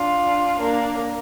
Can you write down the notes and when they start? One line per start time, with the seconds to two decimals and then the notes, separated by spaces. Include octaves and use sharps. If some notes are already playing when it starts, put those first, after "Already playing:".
Already playing: D4 F4
0.59 A#3 D4